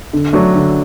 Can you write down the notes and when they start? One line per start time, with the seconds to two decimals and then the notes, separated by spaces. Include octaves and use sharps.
0.13 D3
0.33 F#3 A3 D4
0.54 D3